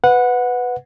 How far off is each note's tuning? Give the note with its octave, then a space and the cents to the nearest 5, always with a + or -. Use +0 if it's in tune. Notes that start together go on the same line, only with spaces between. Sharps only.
B4 +10 F#5 -15